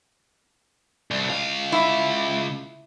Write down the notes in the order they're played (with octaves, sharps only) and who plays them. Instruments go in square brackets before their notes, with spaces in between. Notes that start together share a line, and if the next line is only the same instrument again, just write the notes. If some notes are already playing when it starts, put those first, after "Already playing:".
[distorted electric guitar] C2
C#2 F5
[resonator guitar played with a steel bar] E4